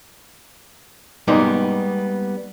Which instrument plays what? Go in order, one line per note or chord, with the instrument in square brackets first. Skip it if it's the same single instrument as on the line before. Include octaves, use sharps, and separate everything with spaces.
[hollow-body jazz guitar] G3 G#3 A#3 B3 D#4